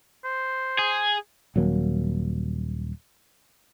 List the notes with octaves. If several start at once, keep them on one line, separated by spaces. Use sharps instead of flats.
C5
G#4
D#1 F#3 A#3